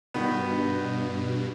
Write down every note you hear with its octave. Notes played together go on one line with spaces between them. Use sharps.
G2 B2 D#3 B3